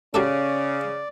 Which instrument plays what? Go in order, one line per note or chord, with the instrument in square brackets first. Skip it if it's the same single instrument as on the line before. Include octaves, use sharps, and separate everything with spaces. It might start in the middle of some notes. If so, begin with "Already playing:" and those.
[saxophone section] C#3 [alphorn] C#4 [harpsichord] F#4 G4 A4 [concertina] D5